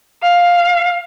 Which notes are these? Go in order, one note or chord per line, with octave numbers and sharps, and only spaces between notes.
F5